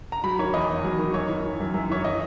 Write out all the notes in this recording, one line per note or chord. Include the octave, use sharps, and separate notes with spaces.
A#5
F#3 B5
D#3 C#5
E2 D#5
E2
F#3
D#3
F#2 C#5
E3
E3
F#2
F#2
E3 C#5
E3 D#5